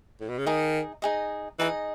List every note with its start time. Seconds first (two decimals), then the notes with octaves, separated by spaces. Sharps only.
0.21 A2
0.29 B2
0.38 C#3
0.46 D#3 D#4 G#4 D#5
1.02 D#4 G#4 D#5
1.59 E3 D#4 G#4 D#5